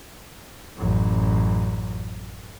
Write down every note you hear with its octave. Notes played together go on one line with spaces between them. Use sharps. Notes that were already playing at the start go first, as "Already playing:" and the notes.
A1 F#2